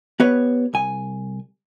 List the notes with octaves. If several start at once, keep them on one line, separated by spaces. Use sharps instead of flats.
B3 G4 B4 C#5
C2 G#5